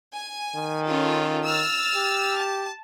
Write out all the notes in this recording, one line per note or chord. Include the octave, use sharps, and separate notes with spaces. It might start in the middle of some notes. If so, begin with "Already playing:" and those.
G#5
D#3
C#4 F4 A4
E6 F6 A6
G4
A5